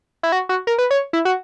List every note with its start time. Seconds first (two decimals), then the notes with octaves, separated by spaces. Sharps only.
0.23 E4
0.32 F#4
0.49 F#4
0.67 A#4
0.78 B4
0.91 C#5
1.13 E4
1.25 F#4